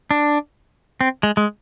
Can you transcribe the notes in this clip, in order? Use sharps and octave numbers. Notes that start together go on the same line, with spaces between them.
D4
C4
G#3
G#3